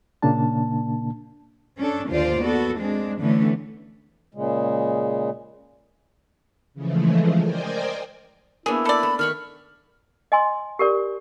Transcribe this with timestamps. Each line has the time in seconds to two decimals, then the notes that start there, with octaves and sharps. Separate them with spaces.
0.22 A#2 C#3 A#3 D4 A5
1.78 C#4 D4 A4
2.10 D#2 D3 F4 C5 D5
2.42 B3 F#4 A4
2.79 G#3 C4 D4
3.21 D3 E3 A3 B3 C#4
4.35 A#2 C#3 G#3
6.74 C#3 E3 F3 G#3 A3
7.42 A#4 C5 D5 D#5 G5 G#5
8.66 A#3 B3 D4 E4 G#4
8.85 A4 D5 B5
9.03 A3
9.19 D#3 B5 C#6 F6
10.32 D#5 G#5 C6
10.79 G4 A#4 D5